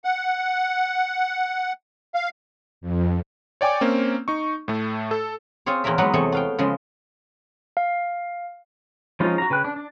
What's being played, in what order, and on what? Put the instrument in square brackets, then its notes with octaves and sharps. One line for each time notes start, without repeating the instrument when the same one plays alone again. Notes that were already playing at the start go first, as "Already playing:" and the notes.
[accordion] F#5
F5
[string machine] F2
[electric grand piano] C#5 D5 G5 G#5 D6
A#3 C4 C#4
D#4 C#6
A2 A3
A4
[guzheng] C4 F4 G#4 C#5
E2 A#2 C4 A#4 E5
E2 F#3 G#3 B3 D#4 B4
E2 C3 A3 G#4 C#5
B3 F5 G5
C#3 F3 G#3
[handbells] F5
[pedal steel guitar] F3 G#3 C#4 D#4 F4
F#4 A#5
C#3 B4 G5 F#6
D4
D4